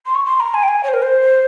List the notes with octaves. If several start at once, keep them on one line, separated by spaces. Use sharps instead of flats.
C6
C#6
C6
A#5
G#5
G5
G#5
C#5
C5
A#4
C5